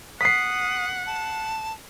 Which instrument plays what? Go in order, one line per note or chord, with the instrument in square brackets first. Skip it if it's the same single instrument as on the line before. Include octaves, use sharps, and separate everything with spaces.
[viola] F#5 [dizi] D#6 [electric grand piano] B6 C7
[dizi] A5